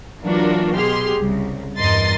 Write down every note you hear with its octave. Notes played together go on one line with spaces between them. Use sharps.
E3 F#3 A#3 D4 F4 F#4
B2 G4 G#4 C6 F6
C2 C#3
E2 G2 A#4 D#5 C6 A6